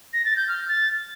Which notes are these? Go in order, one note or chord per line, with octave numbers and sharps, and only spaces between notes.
A#6
A6
G6
F6
A6